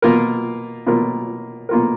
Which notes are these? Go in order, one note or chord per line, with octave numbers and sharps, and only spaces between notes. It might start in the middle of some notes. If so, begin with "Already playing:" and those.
B2 A#3 F4 A#4
B2 A#3 F4 A#4
B2 A#3 F4 A#4